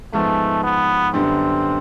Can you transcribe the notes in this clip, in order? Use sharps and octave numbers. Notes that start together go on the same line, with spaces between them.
G#2 F3 G#3 A3 B3
B3
F#2 D3 G3 B3 C4 D4